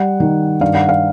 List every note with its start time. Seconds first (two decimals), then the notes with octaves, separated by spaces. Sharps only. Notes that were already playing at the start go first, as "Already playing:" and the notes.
Already playing: G3 F#5
0.20 D#3
0.61 G2 F5
0.75 F#5
0.89 F5